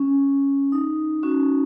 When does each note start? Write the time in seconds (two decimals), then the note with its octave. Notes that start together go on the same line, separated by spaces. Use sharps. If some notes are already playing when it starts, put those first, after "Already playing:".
Already playing: C#4
0.72 D#4
1.23 C#4 F#4